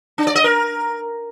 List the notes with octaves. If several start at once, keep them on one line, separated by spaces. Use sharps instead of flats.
D4
D5
D#5
A#4